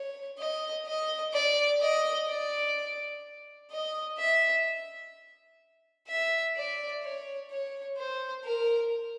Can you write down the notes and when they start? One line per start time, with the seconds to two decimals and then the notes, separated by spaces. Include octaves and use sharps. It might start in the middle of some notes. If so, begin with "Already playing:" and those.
Already playing: C#5
0.39 D#5
0.87 D#5
1.33 D5
1.81 D#5
2.28 D5
3.71 D#5
4.18 E5
6.08 E5
6.56 D5
7.03 C#5
7.51 C#5
7.98 C5
8.45 A#4